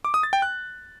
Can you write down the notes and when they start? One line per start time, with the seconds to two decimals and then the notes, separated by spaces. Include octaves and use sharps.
0.05 D6
0.14 D#6
0.23 A6
0.33 G5
0.42 F#6